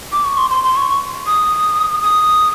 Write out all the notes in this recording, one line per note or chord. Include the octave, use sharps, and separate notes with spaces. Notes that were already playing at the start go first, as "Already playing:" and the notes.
D6
C#6
C6
C6
C6
C#6
D#6
D#6